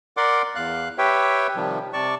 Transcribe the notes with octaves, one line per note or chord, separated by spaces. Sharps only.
A#4 D5 F#5 C6 D6
E2 F5 F#6
G4 B4 C#5 E5 G5
C3 D#3 F3 G3
C3 D5 A5 C#6